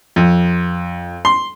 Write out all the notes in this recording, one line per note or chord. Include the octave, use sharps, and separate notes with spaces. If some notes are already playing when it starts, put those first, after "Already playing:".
F2
C6